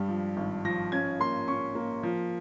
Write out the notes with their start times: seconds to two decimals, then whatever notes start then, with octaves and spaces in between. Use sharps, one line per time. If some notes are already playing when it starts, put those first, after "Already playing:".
Already playing: G2 G3
0.08 F3
0.37 G#1
0.65 F3 A#6
0.92 C#4 G#6
1.20 A#3 C6
1.48 C#4 C#6
1.75 A#3
2.03 F3